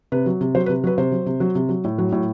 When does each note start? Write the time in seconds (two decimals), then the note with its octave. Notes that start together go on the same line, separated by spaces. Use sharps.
0.12 C3 B4
0.26 F#3
0.41 C3
0.55 F#3 C5
0.66 B4
0.69 C3
0.84 F#3 B4
0.98 C3 C5
1.12 F#3
1.26 C3
1.40 F#3
1.55 C3
1.69 F#3
1.84 A2
1.98 F#3
2.12 A2